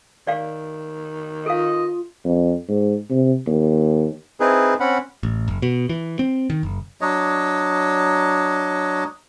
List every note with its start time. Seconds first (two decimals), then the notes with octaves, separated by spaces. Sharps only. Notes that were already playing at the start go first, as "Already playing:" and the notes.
0.27 D#3 D5 F5
1.46 F4 A4 D#5 F5
2.25 F2
2.68 G#2
3.10 C3
3.47 D#2
4.40 C4 D#4 E4 G#4 B4
4.80 C4 C#4 F#5 B5
5.23 A1
5.48 F#1
5.62 B2
5.89 E3
6.19 C4
6.50 D#3
6.63 F#1
7.01 F#3 D4 C#5 D#5